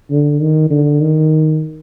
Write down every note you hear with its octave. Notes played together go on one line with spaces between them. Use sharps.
D3
D#3
D3
D#3